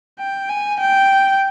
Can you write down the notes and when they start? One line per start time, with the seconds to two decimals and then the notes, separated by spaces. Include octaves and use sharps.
0.19 G5
0.49 G#5
0.80 G5